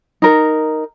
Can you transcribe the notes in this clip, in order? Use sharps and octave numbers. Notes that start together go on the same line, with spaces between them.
D#4 A#4